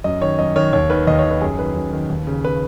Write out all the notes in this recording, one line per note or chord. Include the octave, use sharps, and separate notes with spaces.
F#2 D#5
D#3 C#5
F#2 D#5
D#3 C#5
D#2 C#5
D#3 B4
D#2 D#5
C#5
D#3
B4
F#2 G#4
D#3 B4
F#2
D#3
D#2
C#3
B4